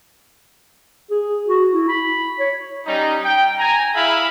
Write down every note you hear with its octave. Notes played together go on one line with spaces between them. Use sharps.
G#4
F#4
E4
B5
C#5
G3 C#4 D#4
G5
G#5 A#5
E4 G#4 E5 F5 B5